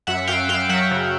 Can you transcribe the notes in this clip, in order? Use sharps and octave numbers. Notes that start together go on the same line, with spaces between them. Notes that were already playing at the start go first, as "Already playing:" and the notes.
F#2 E5 F#5
F#2 F5 G5
F#2 F5 G5
F#3 E5 F#5
C#3